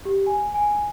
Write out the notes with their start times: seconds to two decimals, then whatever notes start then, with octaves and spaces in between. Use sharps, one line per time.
0.05 G4
0.27 G#5
0.54 G#5